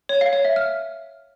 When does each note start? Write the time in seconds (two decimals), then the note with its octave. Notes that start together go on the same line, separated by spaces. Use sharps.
0.09 C#5
0.21 F5
0.33 C#5
0.45 E5
0.56 F6